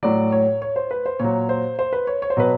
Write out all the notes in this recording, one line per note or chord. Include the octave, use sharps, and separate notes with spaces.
A2 F#3 D5
C#5
C#5
C5
B4
C5
A#2 F#3 C#5
C5
C5
B4
C#5
C#5
C5
B2 F#3 B4